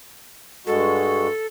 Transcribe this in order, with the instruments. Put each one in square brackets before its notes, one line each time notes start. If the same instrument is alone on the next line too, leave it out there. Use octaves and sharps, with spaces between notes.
[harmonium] G2 G#3 F#4 [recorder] A4